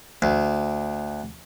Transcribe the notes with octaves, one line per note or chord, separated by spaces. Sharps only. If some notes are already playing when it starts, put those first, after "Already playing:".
D2